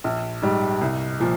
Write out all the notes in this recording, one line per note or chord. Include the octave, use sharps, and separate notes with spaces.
A#1
G#2 G3
C2
A#2 F3